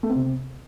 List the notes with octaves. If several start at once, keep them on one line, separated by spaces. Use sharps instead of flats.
A3
C4
C3